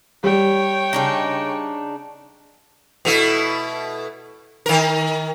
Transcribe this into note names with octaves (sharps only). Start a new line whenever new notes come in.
G3 C#5 G5
C#3 D4 D#4
B2 A3 E4
D#3 A#4